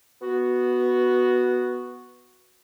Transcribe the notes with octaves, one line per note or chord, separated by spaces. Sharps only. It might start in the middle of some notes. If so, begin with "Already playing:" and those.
B3 F#4